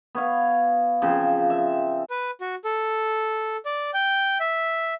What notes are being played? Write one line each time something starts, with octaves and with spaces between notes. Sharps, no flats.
B3 C#5 F5
C#3 F3 C4
E5
B4
F#4
A4
D5
G5
E5